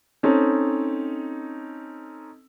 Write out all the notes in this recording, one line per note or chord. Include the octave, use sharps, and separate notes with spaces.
C4 C#4 D#4 A4